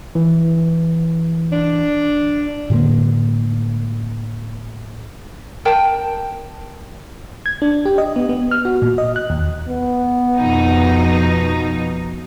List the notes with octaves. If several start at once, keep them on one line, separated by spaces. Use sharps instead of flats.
E3
D4
A2 D3 G#3 A#3
A#4 G5 A5
G#6
D4
G4
D#5
B3
B3
F6
F#4
A#2
D#5
F#6
D#2
B3
F2 B2 D#4